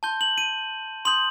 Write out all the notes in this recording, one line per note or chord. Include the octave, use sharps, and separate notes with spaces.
A5 C6 G6 G7
F#7
D#7
C6 D#6 G6 F#7